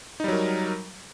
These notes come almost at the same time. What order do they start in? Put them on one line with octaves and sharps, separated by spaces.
D#4 G3 F#3 A#4